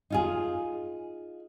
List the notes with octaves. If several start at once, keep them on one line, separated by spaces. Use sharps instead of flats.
D#4 F4 G#4